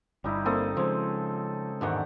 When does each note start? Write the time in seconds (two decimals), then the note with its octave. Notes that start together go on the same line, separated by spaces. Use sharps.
0.24 G1 G2 G3 D#4 E4
0.46 A#3 C4 A4 D#5
0.77 C#3 F3 G#3
1.81 E2 G#2 D#3 D4 G4 F#5